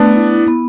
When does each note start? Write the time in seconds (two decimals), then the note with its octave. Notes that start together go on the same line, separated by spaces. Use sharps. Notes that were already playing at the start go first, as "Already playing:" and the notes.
Already playing: A3 B3 D4
0.16 E4
0.48 B3